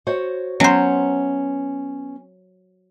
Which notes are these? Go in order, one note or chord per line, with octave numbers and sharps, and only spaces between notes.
F#4 C5 C#5
F#3 B3 C#4 C5